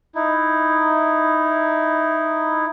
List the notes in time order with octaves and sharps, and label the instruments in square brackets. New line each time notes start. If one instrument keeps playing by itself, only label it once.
[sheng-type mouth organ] D#4 E4